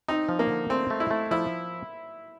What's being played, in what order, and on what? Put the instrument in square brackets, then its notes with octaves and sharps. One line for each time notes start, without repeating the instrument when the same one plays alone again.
[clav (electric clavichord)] C4 [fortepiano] D#4
[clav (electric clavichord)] F3
[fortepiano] A#3
[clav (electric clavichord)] D3
[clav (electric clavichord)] A3 [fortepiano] C4
[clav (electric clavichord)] A3
[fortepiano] E4
[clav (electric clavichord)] A3
[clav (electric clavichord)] F3 [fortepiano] E4